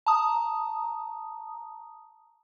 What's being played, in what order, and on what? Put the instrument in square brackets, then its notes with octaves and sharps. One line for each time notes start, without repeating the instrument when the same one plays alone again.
[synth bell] A5 A#5 D#6